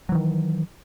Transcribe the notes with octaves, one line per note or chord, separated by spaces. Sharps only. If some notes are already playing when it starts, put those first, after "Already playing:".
D#3 E3 F#3